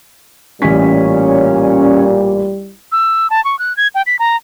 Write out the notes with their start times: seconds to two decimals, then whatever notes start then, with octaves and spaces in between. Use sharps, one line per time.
0.62 A1 A#2 G3 C#4 B6
2.92 E6
3.30 A5
3.45 C#6
3.59 F#6
3.77 G#6
3.95 G5
4.06 B6
4.19 A#5